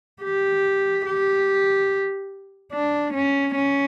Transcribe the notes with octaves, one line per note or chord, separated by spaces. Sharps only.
G4
G4
D4
C#4
C#4